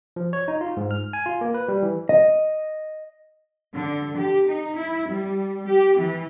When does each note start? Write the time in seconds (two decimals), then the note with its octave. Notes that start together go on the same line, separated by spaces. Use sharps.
0.16 F3
0.33 C#5
0.48 D#4
0.61 F4
0.77 G#2
0.91 F6
1.13 G#5
1.26 F4
1.41 A#3
1.54 B4
1.68 G3
1.83 E3
2.09 D#5
3.74 D3
4.15 G4
4.46 D#4
4.75 E4
5.11 G3
5.67 G4
5.97 E3